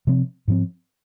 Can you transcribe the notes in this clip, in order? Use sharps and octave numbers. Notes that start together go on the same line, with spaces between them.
C3 F3 C4
G#2 F3 C4